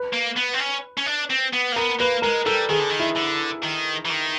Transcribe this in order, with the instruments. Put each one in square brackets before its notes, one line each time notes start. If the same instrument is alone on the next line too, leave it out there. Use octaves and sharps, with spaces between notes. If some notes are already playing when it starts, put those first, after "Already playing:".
Already playing: [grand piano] B4
[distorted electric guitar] A#3
B3
C4
C#4
C#4
D4
C4
B3
A#3
[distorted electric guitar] B3 [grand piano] A#4
[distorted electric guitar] A#3 [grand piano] B4
[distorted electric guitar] G#3 [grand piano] A#4
[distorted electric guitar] G3 [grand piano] A4
[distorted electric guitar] D#3 [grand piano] G#4
[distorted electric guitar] D3
D#3
[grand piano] E4
[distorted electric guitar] D3
D#3
E3
D#3